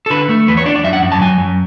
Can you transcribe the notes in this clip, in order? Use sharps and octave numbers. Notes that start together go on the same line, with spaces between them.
A4
D3 B4
A3
E2 B4
C#5
D4 D5
D5
F#2 E5
F#5
F#2
A5
F#3 G#5
F#2